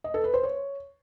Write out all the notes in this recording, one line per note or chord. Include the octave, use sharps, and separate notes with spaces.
D#5
A4
B4
C5
C#5